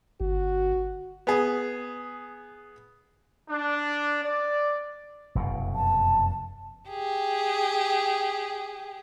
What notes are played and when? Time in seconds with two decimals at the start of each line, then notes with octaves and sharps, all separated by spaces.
0.21 G1 F#4
1.27 B3 G#4
3.49 D4
4.23 D5
5.35 F1 F#2 B2
5.75 A5
6.89 G4 G#4